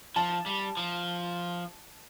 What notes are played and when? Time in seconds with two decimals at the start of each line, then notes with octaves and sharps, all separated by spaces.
0.16 F3 A5
0.46 G3
0.77 F3